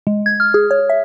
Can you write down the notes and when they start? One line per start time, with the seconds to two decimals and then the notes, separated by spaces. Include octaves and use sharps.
0.07 G#3
0.26 G#6
0.40 F6
0.54 G#4
0.71 C#5
0.89 E5